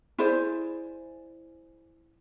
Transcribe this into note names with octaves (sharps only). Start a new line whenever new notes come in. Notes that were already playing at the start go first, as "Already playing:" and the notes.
E4 G#4 C5 D5